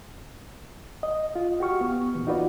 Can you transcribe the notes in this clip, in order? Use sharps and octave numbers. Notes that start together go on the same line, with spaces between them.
D#5
F4
F#4 G4 C#6 F6
B3
F2 A#2 E3
D#4 F4 F#4 B4 D5